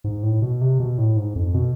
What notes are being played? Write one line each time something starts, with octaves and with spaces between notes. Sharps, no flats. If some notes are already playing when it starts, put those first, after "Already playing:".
G#2
A2
B2
C3
B2
A2
G#2
F2
B2